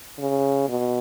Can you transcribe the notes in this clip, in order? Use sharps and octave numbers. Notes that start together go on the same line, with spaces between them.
C#3
B2